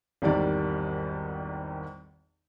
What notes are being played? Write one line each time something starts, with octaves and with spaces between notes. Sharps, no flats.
G#1 E2 D#3 G3 D5